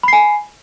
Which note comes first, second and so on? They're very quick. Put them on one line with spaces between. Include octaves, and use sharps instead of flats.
B5 C7 G#5